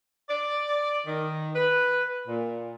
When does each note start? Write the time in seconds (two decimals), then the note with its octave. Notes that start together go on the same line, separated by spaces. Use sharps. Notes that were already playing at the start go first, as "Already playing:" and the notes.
0.29 D5
1.06 D#3
1.55 B4
2.28 A#2